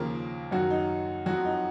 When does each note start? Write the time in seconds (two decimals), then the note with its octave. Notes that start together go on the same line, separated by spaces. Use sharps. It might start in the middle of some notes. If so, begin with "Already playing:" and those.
Already playing: D#2 C#3 F3 A#3 A#4
0.51 F#2 D#3 F#3 F#4
0.70 D#4
1.26 F2 F3 F#3 F#4
1.45 D#4